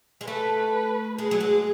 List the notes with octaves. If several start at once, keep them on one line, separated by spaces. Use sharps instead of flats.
G#3
A3 B4
G#3 G#4
F#3
G#3